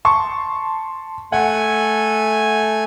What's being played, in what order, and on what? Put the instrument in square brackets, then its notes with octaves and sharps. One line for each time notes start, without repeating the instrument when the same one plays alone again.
[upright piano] A5 C6 C#6
[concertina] A3 G#5 [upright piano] F#5